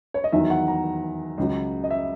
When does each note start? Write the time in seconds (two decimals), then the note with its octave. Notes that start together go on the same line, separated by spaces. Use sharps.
0.14 C#5
0.24 D#5
0.32 E2 D#3 F#3 E5
0.50 F#5
0.68 A#5
1.38 C#2 C#3 F#3
1.84 D#5
1.91 E5